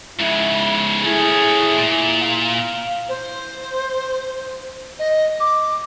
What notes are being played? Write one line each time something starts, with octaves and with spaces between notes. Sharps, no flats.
G#2 C#3 E4
A3 C#4 E4 G#4
A#2
F5
C5
D#5
D6